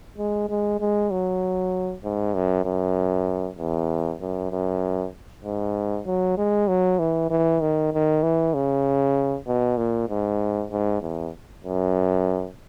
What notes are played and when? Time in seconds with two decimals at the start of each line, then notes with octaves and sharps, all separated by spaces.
0.18 G#3
0.49 G#3
0.80 G#3
1.11 F#3
2.04 G#2
2.34 F#2
2.65 F#2
3.58 E2
4.21 F#2
4.51 F#2
5.45 G#2
6.06 F#3
6.38 G#3
6.68 F#3
6.99 E3
7.30 E3
7.61 D#3
7.93 D#3
8.23 E3
8.54 C#3
9.47 B2
9.77 A#2
10.09 G#2
10.71 G#2
11.01 E2
11.64 F#2